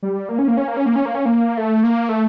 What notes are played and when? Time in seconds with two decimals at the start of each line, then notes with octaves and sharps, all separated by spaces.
0.03 G3
0.29 A#3
0.39 C#4
0.48 A#3
0.57 C#4
0.68 A#3
0.77 C#4
0.86 A#3
0.96 C#4
1.06 A#3
1.15 C#4
1.26 A#3
1.57 A3
1.83 A#3
2.09 A3